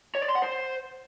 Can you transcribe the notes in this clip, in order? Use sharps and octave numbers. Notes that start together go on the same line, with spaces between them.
C#5
D5
C6
F#5
C5